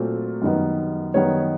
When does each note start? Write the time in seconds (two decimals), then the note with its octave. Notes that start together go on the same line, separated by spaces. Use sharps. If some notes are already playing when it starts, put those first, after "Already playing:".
Already playing: A#2 F#3 A3 C4 F4
0.42 F#2 D#3 G3 B3 D#4
1.14 F#2 D#3 G3 B3 D#4 C#5